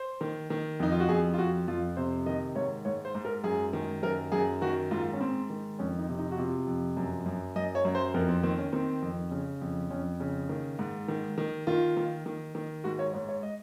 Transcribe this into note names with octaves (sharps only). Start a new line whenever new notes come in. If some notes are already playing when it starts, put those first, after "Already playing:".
Already playing: C5
D#3
D#3
F2 D#4
F4
F#4
F2 G#4
F4
F2 F#4
F2 F4
C3 C5
D#3 D#5
G#2 C#5
G#2 C#5
C5
G#2
A#4
F#2 G#4
D#3
F#2 A#4
F#2 G#4
D#3 F#4
G#2 F4
C#4
G#2 C4
D#3
F2 C#4
D#4
C3
D#4
F#4
C3 F4
F2
F#2
F#2
F#2 D#5
C#5
F#2
C5
F2 A#4
C4
D#3 C4
C#4
D#3 C4
F2
C#3
F2
F2 C#4
C#3
D#3
G#2
D#3
D#3
D#3 F4
D#3
D#3
D#3
G#2 F#4
C#5
G#2 C#5
C#5
D#5